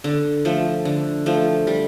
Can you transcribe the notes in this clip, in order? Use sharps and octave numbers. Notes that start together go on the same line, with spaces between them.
D3
F3 A3
D3
F3 A3
G3